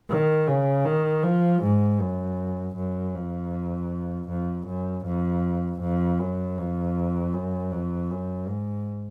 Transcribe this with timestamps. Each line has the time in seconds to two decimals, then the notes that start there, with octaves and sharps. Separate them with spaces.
0.10 D#3
0.48 C#3
0.85 D#3
1.23 F3
1.62 G#2
2.00 F#2
2.75 F#2
3.15 F2
4.29 F2
4.67 F#2
5.05 F2
5.81 F2
6.19 F#2
6.58 F2
7.34 F#2
7.71 F2
8.10 F#2
8.48 G#2